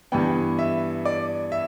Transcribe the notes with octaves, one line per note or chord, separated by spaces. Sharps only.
G2 E3 B3 G5
E5
D5
E5